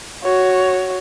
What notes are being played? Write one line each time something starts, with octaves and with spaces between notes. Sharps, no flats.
F#4 C#5